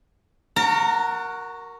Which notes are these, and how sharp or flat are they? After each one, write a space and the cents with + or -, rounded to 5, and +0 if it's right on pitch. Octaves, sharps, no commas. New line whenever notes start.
F#4 +0 A#4 +0 A#5 -45